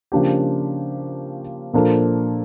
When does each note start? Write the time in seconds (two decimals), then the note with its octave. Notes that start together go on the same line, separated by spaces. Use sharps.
0.12 C#3 F3 A#3 D4 G4
1.73 A#2 F3 A#3 D4 A4